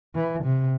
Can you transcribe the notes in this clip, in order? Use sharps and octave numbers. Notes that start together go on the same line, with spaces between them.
E3
C3